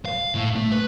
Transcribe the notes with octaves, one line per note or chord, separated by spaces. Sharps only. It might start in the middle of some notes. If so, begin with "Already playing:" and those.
F5
A2
A3
B4